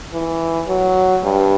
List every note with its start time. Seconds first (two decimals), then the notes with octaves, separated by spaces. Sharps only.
0.12 E3
0.68 F#3
1.24 G2